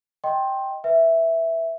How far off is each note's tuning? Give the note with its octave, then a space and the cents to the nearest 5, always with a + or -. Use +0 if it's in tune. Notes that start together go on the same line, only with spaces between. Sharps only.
D#5 +0 G5 +0 C6 +25
B4 +0 E5 +0